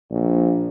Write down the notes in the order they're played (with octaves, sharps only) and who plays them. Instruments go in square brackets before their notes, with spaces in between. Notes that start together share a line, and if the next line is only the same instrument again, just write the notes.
[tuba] A#1